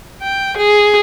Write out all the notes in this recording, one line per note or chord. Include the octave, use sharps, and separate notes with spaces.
G5
G#4